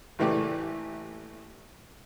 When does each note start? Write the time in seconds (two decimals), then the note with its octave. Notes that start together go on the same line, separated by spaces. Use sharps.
0.19 A1 A#2 E3 A3 G4 D5